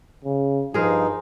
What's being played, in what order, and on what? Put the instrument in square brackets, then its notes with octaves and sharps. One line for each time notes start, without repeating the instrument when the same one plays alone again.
[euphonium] C#3
[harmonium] G2 D#4 [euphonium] F3 [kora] G#4 A#4 C5